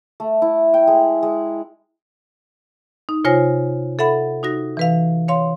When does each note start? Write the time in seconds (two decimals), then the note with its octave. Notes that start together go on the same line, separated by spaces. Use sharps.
0.20 A3
0.42 E4
0.74 G5
0.87 G#3
1.23 G#3
3.09 D#4
3.24 C3 F4 C5 C#5 G#5 A#6
3.99 A4 E5 F#5 B5
4.43 D#4 F#4 A#6
4.77 E3 B4 F5
5.28 C#5 F5 C6